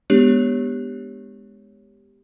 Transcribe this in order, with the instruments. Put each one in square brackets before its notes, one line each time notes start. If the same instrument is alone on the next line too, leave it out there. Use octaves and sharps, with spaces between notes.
[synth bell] G#3 B3 D4 G4 C#5 F#6